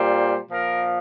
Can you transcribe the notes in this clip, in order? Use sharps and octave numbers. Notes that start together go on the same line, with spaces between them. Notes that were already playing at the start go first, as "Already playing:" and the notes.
Already playing: A#2 G3 C5
A#2 F3 A#4